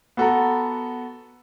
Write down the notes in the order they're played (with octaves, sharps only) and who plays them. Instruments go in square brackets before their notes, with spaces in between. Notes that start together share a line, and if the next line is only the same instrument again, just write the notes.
[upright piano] B3 F#4 A4 F#5 A#5